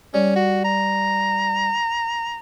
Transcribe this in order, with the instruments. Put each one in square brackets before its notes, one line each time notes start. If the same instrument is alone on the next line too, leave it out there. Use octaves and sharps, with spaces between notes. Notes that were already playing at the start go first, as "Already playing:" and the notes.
[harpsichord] G3 [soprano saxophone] C#4
[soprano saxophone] F#4
A#5